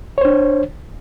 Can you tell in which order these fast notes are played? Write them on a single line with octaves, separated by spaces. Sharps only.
C#5 C5 D4